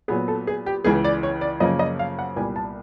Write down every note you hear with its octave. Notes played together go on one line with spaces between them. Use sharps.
A#2 F#3 B3 G#4
A4
G#4
G4
C#2 C#3 E3 G#4
D5
C#5
D5
F#2 C#3 F3 A#3 C#4 D#5
D#5
F5
F#5
C2 A#2 G3 B3 G#5
A5